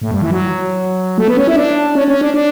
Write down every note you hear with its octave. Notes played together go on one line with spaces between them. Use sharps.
A2
G2
E3
F#3
A3
B3
C#4
E4
D4
C#4
C#4
D4
D4